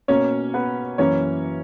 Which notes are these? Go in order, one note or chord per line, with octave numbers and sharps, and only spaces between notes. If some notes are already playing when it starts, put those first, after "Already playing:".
B2 A#3 C#4 C#5
B3 B4
F#2 E3 A#3 C#4 C#5